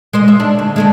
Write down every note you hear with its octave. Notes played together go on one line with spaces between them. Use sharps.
G#3 C5 D#5
E5
D4
D2
G#3 A3 D4